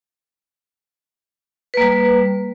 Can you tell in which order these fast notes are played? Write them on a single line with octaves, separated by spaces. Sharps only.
B4 A#3 G3